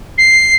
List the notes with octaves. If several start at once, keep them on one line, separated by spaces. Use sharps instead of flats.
C7